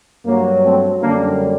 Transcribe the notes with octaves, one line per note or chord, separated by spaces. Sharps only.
G2 F#3 A#3
A3 C4
F#2 D3 G3 A#3 D4